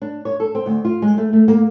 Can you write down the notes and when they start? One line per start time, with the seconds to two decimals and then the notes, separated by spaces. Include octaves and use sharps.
0.02 D4
0.25 C#5
0.40 A4
0.55 C4
0.66 D2
0.85 F4
1.02 G#3
1.18 A3
1.33 A3
1.48 A#3